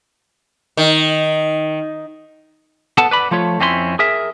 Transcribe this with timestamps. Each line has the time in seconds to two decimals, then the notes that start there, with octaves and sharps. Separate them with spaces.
0.77 D#3
2.98 B3 A4 F#5 A5
3.11 B4 D5 B5
3.31 F3 A3 F4 C#5
3.60 F2 C4 C#4 E4 G4 C6
3.99 G#4 A#4 E5